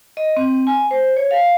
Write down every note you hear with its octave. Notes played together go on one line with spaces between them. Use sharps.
D#5
C4
G#5
C5
C#5
F5